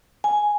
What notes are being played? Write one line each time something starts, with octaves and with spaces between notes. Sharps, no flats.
G#5